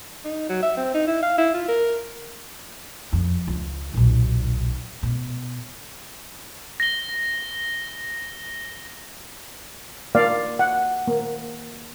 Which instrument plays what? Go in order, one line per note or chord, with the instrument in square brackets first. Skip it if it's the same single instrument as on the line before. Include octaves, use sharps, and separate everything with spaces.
[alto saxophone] D#4
F#3
E5
C4
D#4
E4
F5
E4
F4
A#4
[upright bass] F2
C#2
D#1 B1
B2
[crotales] A#6 G7
[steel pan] A#3 D5 F5
F#5
A#3